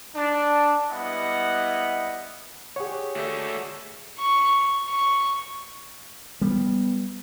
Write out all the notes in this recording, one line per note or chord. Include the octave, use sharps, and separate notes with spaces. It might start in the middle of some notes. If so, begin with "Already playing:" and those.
D4
G3 B3 E4 D#5 F#5
G4 G#4 C#5 F#5
A3 F#4 E5
C#6
C#6
G3 B3